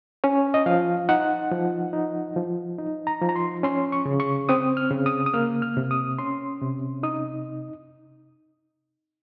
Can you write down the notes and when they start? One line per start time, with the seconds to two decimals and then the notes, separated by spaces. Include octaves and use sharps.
0.24 C#4 C#5
0.54 D#5
0.66 F3 F5
1.09 D#4 F#5
1.51 F3
1.93 D#4
2.36 F3
2.78 D#4
3.07 A#5
3.22 F3
3.29 A#5
3.36 C6
3.63 C#4 C6
3.92 C#6
4.06 C#3
4.20 C#6
4.49 C4 D#6
4.77 F6
4.91 C#3
5.06 D#6
5.26 D#6
5.34 A#3 F6
5.62 F6
5.77 C3
5.91 D#6
6.19 C#4 C6
6.62 C3
7.03 D#4 D#6